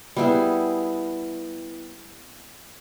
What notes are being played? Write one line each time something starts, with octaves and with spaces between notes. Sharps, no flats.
G3 B3 E4 G#4